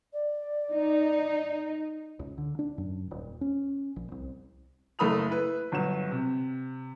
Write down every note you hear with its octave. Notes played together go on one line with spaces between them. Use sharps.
D5
D#4
C#2
D3
D4
F#2
D#1
C#4
A#1
C2
F#1 A3 A#3 B5 D#6 F7
E4 B4
G1 F#3 E7
C3